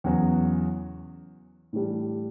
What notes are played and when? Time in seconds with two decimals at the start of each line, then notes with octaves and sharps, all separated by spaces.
0.04 E2 C#3 F#3 B3
1.73 A2 E3 G3 D4